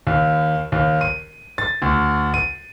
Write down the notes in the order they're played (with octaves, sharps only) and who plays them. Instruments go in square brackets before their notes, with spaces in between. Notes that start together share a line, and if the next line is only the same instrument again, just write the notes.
[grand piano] D#2
D#2
D#7
A6
D2
D#7